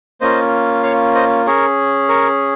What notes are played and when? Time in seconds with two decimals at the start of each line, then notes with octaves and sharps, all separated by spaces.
0.21 A#3 C#4 F4 C5 D#5
0.83 C#5 F5
1.15 C5 D#5
1.46 C#4 G#4 A#4 C#5
2.09 A#4 C#5